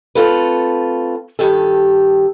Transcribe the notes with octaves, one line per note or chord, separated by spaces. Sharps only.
A3 C4 F4 A4 B4
G2 C3 D#3 G4 A4